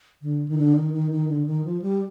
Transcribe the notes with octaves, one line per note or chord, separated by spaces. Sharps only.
D3
D#3
D3
D#3
D#3
D#3
D3
D#3
F3
G3